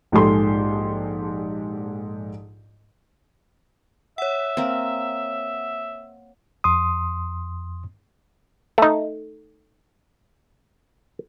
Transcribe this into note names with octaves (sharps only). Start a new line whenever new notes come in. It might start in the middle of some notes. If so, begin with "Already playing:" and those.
A#1 G#2 G#3 G4 A4 C6
C#5 E5 F#5
A#3 C4
F2 C6 D#6
A3 D#4